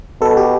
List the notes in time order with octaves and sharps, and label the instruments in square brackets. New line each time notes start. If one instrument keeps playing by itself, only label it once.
[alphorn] B2 [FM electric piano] A4
[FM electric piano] G4